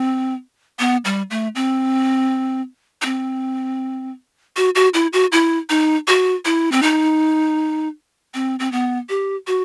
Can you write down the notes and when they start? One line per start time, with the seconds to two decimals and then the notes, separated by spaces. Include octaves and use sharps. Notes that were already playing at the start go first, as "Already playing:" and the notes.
Already playing: C4
0.79 B3
1.05 G3
1.30 A3
1.55 C4
3.02 D#4
3.05 C4
4.57 F#4
4.75 F#4
4.94 E4
5.13 F#4
5.32 E4
5.70 D#4
6.08 F#4
6.45 E4
6.72 C4
6.82 D#4
8.34 C4
8.59 C4
8.72 B3
9.09 G4
9.47 F#4